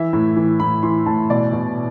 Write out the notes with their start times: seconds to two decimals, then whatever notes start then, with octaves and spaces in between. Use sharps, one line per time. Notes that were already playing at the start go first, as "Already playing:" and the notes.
Already playing: E3 E5
0.13 A2
0.36 E3
0.60 A2 B5
0.83 E3 C6
1.06 A2 A5
1.30 B2 D5
1.53 B2